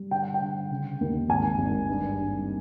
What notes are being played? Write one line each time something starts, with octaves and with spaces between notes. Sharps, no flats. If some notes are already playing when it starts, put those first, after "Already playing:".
Already playing: G3
D3 G5
F#5
G5
D3
C#3
D#2
G#1 G#5
G#1
G2
G2